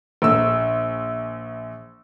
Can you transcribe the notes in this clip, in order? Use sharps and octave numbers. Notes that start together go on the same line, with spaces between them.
A#1 E6